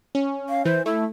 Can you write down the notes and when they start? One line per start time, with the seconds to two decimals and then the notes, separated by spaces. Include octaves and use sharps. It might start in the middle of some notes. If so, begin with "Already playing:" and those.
0.15 C#4
0.49 F5
0.65 E3 C5
0.86 A3 E4